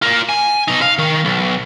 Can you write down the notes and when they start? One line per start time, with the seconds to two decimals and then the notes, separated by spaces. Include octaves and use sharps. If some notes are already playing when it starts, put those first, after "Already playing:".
0.02 F4 A#4
0.29 G#5
0.68 B2 D#4
0.82 F5
0.98 D#3
1.25 B1